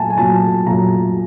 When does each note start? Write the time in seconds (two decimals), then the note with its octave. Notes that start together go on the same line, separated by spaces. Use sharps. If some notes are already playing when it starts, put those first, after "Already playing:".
Already playing: A#2 F#3 A3 G#5 A5
0.10 G#5
0.17 A#2 F#3 A3 A5
0.66 A#2 F#3 A3 A#5